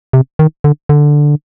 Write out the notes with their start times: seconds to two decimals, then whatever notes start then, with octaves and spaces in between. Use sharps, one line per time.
0.13 C3
0.39 D#3
0.64 D3
0.89 D3